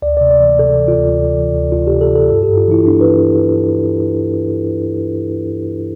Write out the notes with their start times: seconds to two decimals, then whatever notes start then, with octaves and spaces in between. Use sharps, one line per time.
0.02 D2 D5
0.17 C3 D5
0.31 D5
0.40 E3
0.59 C3 A4
0.78 E3
0.88 F4
0.97 D2
1.15 D2
1.35 E3
1.53 D2
1.72 D2 F4
1.87 C3 G4
2.01 A4
2.10 C3
2.15 A4
2.29 G2 A4
2.43 G4
2.49 G2
2.57 F4
2.68 E3 E4
2.85 B3 D4
3.01 B4